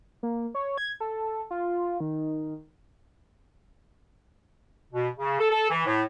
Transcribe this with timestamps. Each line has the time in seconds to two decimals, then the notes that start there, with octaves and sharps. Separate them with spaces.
0.23 A#3
0.55 C#5
0.78 G#6
1.00 A4
1.51 F4
2.00 D#3
4.93 B2
5.17 C#3
5.39 A4
5.51 A4
5.70 E3
5.86 A2